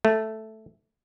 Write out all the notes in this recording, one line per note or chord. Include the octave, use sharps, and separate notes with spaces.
A3